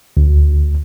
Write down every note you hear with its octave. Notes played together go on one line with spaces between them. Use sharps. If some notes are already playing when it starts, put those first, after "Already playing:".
D2